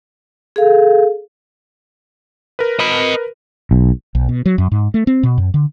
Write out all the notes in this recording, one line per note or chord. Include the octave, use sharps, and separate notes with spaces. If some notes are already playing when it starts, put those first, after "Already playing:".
G#4 A4 F5
A#4 B4
D#5 B5
B1
B1
B2
F#3
F#2
G#2
A3
C4
B2
F#2
D3